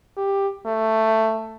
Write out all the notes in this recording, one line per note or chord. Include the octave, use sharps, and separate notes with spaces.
G4
A3